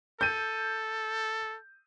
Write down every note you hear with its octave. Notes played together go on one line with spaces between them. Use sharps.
A4 G6 D#7